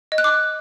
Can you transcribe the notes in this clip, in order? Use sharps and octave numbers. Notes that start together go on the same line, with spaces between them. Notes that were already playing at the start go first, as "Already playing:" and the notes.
D#5
F#6
D6